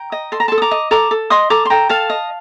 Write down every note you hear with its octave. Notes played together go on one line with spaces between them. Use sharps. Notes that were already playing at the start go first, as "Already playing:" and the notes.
Already playing: G5 A#5
D#5
A4 C6
A#5
A4 A5 C6
D#6
A#5 D6
D#5
A4 A#5 D6
A4
D#5 C6 D#6
A4 A#5 D6
C6
A4 G5 A#5
A4 F5 A5
D#5